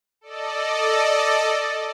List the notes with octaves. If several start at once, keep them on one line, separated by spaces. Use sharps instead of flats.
A4 D5 D#5